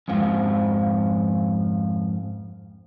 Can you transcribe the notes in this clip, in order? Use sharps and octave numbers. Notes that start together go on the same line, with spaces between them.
F2 G#2 F3